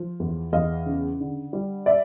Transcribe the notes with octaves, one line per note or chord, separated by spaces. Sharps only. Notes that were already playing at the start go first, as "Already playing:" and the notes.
Already playing: F3
E2
E2 D#5 F5
C#3
D3
G3
D5 E5